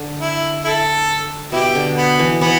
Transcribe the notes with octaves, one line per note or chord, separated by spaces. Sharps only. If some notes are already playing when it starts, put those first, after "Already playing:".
Already playing: D3
E4
E4 A4
B2 E4 G4
D3
B3
E3
E3 B3